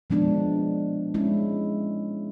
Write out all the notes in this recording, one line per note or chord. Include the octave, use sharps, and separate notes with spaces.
A#2 F3 G#3 B3 D4
G#3 C#4 E4